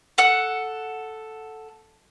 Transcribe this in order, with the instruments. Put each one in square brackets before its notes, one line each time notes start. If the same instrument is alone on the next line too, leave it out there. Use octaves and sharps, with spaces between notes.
[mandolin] A4 F#5 F#6